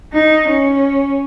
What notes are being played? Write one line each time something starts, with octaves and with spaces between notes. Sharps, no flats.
D#4
C#4